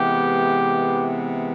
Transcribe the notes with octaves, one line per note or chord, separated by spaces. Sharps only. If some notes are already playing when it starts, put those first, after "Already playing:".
Already playing: C3 E3 G#3 B3 G4